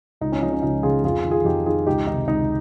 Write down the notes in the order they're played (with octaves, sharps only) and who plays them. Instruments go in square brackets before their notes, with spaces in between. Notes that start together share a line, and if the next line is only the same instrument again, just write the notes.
[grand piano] C#2 D#4
C#4
C#3 F3 D#4
C#4
C#2 D#4
C#3 F3 F4 G#4
F2 F4 G#4
D#3
F4 G#4
F2 D#4 G4
D#3 F4 G#4
C#2 D#4 G4
C3 D#3 D#4
C#2 D#4